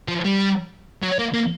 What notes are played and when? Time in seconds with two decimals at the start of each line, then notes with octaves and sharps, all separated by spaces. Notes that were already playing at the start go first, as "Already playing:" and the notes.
0.08 F3
0.25 G3
1.02 F#3
1.19 A#3
1.34 A#3